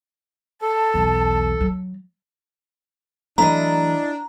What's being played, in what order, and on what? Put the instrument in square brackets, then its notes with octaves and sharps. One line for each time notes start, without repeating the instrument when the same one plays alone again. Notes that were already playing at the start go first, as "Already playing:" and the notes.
[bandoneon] A4 [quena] A5
[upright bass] B1 E2
F#3
[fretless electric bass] E3 F#3 A3 [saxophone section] D4 [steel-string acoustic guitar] E4 D#5 [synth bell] A#5